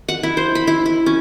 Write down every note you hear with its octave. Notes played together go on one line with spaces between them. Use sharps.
F#5
E4
C5
B5
E4
E4
C#4